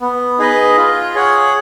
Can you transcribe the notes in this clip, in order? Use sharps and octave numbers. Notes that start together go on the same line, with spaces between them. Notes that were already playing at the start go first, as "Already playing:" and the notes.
B3
D#4 G#4 B4 D#5
F4
G#4 C#5 F#5